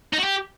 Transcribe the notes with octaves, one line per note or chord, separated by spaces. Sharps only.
D#4
F#4
G4